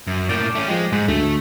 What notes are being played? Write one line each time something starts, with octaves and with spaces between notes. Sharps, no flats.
F#2
A2 A#3 D5 G5 A5
A3 C#4
F3 G#3 G4
G#2 G#3 F#5
D2 A3